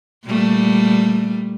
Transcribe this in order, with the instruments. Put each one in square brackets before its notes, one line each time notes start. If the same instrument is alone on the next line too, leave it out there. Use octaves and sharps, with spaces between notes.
[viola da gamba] A#2 G3 A3